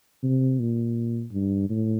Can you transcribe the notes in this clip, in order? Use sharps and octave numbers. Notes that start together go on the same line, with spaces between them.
C3
A#2
G2
A2